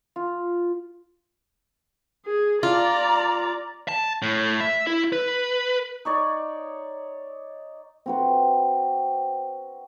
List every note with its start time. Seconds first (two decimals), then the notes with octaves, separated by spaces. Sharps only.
0.16 F4
2.26 G#4
2.63 F4 D5 A#5
3.88 A5
4.22 A2
4.60 E5
4.87 E4
5.13 B4
6.05 D#4 C#5 D5
8.06 C4 F#4 B4